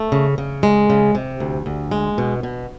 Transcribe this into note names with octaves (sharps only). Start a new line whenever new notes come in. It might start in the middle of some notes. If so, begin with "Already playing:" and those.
Already playing: A3
C#3
C#3
G#3
C#3
C3
D2
D2
G#3
B2
B2